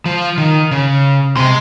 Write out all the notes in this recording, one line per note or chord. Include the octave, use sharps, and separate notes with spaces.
F3
D#3
C#3
C3 G#3